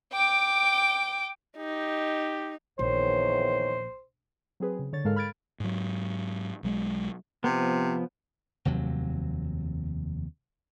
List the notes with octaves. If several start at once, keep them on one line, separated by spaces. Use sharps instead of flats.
G5 D6
D#4 G4
A#1 E2 D#3 C5 C#5
F#3 C4 G#4 B4
C#3
D3 C#5 A6
G#2 G#3 A4 A#4 F5 F6
B5 F6 G#6 A6 D7
G#2 F#3
B1 F#3 G#3
C3 F3 B3
F1 D#2 C3 F#3